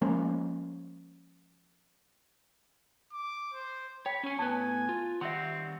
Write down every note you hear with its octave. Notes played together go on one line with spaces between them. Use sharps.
F3 G#3 A#3 C#4
D6
C5
C#5 G5 B5
C#4 C#5 G#5
A2 B3 B4 G#5 A5
F4
D#3 G3 C4 E5 F#5 C6